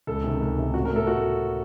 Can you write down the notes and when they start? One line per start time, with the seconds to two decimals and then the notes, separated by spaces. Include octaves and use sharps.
0.07 C#2 A4
0.24 C3 D#3
0.41 C#2
0.57 C3 D#3
0.74 A1 F#4
0.85 A#4
0.91 A2
0.96 A4
1.07 F#4